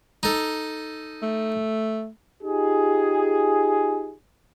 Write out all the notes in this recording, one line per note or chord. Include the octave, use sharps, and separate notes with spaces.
D#4 A4
A3
D#4 F4 G4 G#4